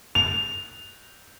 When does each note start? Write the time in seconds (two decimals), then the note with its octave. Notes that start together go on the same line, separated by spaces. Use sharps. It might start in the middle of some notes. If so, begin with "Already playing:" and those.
0.15 F7